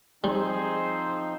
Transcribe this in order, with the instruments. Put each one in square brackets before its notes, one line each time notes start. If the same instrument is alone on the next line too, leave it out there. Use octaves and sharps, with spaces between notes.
[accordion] F3 C4 D#4 [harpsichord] G3 [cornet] G#4 [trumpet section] C5